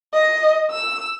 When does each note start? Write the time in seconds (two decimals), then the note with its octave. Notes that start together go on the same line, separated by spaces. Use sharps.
0.14 D#5
0.71 E6